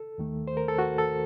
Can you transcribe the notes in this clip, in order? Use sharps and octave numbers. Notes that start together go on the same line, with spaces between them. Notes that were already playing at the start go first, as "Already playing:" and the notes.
Already playing: A4
D#2 D#3 A3
C5
A#4
A4
F#4
A4